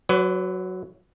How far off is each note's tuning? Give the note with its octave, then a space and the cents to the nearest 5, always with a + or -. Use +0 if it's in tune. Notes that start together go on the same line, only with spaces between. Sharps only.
F#3 +0 B4 +35 D5 -45